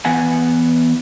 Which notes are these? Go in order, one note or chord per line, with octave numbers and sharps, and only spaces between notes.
E3 B3 F#5 G#5